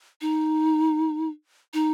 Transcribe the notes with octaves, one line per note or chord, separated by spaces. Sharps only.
D#4
D#4